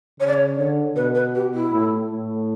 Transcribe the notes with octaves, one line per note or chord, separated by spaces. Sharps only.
C#3 C#5
D5
C#5
D3 C#5
B2 B4
B4
G4
E4
A2
A2